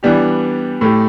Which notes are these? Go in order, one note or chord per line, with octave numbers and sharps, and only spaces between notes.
E3 G3 B3 D4 G4
A2 A3 G4